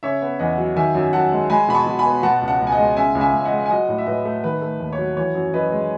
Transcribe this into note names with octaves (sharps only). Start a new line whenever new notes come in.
C#3 C#5 E5
B3
E2 D#5 F#5
F#3
D#3 E5 G#5
F#2
F#2 F#5 A5
G#3
G#3 G#5 B5
B2 B5
A5 C#6
B2
G#5 B5
B3
B2 F#5 A5
C#2
F#5 A5
C#2
G#5
D#5 F#5
G#3
C#3 E5 G#5
C#2
E5 G#5
C#2
D#5 F#5
G#3
G#5
F#3 D#5 F#5
A2
E5
A2 B4 D#5
A3
D#3 B4
A3
D#2
C#5
F#3
E3 C#5
F#2
F#2 B4 D#5
G#3